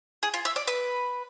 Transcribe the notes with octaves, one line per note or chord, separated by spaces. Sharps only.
G#4
F4
E5
D5
B4